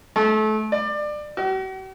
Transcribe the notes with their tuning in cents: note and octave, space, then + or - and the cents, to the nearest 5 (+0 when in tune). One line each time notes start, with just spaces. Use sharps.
A3 -30
D5 +25
F#4 +45